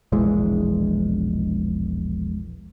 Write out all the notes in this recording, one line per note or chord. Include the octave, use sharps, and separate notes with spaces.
E1 A#1 E3 G#3